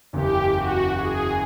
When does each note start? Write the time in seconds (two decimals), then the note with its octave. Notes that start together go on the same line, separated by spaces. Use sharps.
0.13 F#1 E2 C#3 G4
0.55 F#4
0.97 G#4